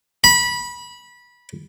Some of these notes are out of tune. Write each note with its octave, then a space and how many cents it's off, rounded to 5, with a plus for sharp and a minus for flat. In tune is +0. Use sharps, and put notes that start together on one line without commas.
B5 -20